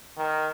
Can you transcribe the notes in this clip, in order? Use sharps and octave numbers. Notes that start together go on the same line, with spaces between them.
D#3